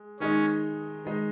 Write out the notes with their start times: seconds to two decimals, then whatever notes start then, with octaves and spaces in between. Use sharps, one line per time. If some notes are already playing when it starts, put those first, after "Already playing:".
Already playing: G#3
0.20 D#3 G#3 C#4 D#4
1.05 D#3 G#3 D#4